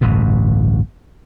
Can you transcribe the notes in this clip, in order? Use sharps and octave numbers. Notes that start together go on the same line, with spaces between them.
D1 A1 G2 B2